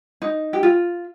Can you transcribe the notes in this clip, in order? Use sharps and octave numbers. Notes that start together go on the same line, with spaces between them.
D#4
G4
F4